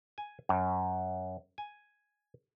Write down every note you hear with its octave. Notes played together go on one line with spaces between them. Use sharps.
G#5
F#2
G#5